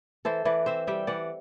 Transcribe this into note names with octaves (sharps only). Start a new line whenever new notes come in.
E3 A4 C5
E3 B4 D5
C4 C5 E5
G3 E5 G5
E3 D5 F#5